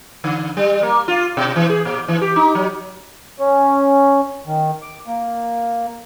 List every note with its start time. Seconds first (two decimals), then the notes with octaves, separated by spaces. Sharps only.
0.24 D3
0.57 G3
0.83 A#3
1.08 F4
1.37 B2
1.56 E3
1.70 G#4
1.85 A#2
2.08 E3
2.22 G4
2.36 D#4
2.55 F#3
3.39 C#4
4.47 D#3
4.82 D6
5.08 A#3